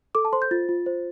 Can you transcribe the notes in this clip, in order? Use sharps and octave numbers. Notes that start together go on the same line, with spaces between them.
A4 D6
A5
C5 C6
G6
F4 A6
F4
C5